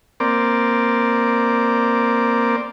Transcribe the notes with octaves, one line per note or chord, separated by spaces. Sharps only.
A#3 C4 D5